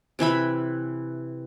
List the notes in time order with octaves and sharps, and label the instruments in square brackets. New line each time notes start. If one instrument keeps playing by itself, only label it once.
[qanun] C3 E3 E5 B5